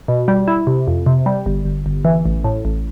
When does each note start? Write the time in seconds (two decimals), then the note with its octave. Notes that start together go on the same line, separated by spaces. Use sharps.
0.08 B2
0.28 G3
0.48 E4
0.67 C3
0.87 F2
1.06 C3
1.26 G3
1.46 G1
1.65 G1
1.86 G1
2.05 E3
2.26 A1
2.44 A2
2.65 A1